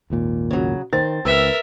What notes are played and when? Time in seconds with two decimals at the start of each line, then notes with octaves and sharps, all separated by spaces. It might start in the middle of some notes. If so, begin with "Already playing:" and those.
0.10 G#1 D#2 A#2
0.51 C#3 F#3
0.93 D#3 C4 A6
1.25 C#2 A#4 B4 E5 E6